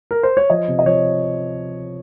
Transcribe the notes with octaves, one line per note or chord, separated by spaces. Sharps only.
A#4
C5
C#5
F3 D#5
C3
D#5
F3 C#5